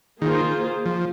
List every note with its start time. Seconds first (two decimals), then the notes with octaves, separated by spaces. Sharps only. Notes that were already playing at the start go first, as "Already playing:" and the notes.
0.22 D#3 A#3 F4 G#4 C5
0.86 F3